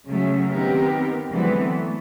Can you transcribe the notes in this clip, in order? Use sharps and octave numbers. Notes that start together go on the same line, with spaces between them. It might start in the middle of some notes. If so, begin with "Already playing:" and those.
C#3 F#3 A3 C#4
D#3 B3 C4 G4 A#4
D3 E3 F#3 G#3 B3 C4
A3